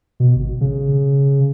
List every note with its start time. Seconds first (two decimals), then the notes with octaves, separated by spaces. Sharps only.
0.20 B2
0.36 G#1
0.61 C#3